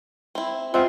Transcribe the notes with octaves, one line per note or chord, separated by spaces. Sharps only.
C4 E4
G#3 C4 F4 E5 F#5